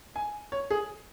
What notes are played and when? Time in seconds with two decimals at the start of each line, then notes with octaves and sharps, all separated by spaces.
0.16 G#5
0.52 C#5
0.71 G#4